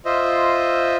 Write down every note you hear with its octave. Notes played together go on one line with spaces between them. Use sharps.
F4 C5 D#5 E5